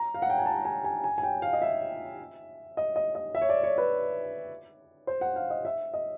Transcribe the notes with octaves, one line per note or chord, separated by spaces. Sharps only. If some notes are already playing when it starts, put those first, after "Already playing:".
Already playing: A#5
F5
F#5
G5
G#5
A5
G#5
G#5
G#5
G#5
G5
F5
D#5
E5
D#5
D#5
D#5
E5
C#5
D5
C#5
B4
C5
F#5
F5
D#5
E5
D#5